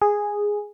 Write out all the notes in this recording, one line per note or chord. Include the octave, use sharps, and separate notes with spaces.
G#4